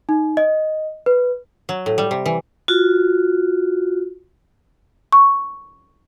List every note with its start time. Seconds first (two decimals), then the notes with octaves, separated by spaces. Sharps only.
0.09 D#4
0.37 D#5
1.06 B4
1.69 F#3
1.86 A2
1.98 G3
2.11 C3
2.26 E3
2.68 F4 F#4
5.12 C#6